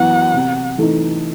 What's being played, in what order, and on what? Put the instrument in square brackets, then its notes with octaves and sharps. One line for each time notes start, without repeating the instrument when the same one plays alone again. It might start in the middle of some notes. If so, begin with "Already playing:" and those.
Already playing: [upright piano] F#2 E3 B3 E4 [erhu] F#5
[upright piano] C3
E3 A3 D#4